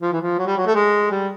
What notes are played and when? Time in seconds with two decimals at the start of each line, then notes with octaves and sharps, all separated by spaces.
0.02 F3
0.12 E3
0.21 F3
0.38 F#3
0.47 G3
0.57 F#3
0.66 A3
0.75 G#3
1.11 G3